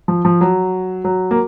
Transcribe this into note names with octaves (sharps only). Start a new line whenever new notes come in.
F3
F3
F#3
F#3
A#3